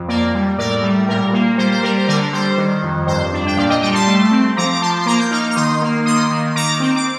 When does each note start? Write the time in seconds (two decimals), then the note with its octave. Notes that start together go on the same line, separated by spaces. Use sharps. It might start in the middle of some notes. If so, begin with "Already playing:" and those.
Already playing: F2
0.08 A#3 A#4 D5
0.34 G3
0.58 A2 A#4 D5
0.83 G3
1.09 A#2 A#4
1.33 A#3
1.58 G3 C5
1.72 C5
1.83 G3 A#4
1.98 C5
2.08 D3 A#4 D5
2.33 G3 C5
2.58 D#3
2.83 F2
3.07 G2 C5
3.33 D4
3.47 G5
3.57 A#2 D5 F5
3.69 D#5 G5
3.82 G3 D#5 G5
3.94 A5 C6
4.07 A3
4.31 C4
4.57 F3 A#5 D6
4.72 D6
4.81 F3 A5 C6
5.01 C6
5.06 A#3 A#5 D6
5.19 G6
5.31 D#4 D6 F6
5.50 F6
5.56 D#3 C6 D#6
5.82 A#3
6.06 D#3 C6 D#6
6.30 D#3
6.55 D#3 A#5 D6
6.80 C4
6.96 D6